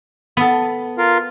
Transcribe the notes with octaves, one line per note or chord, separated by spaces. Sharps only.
B3 A4
F4 A#4 F5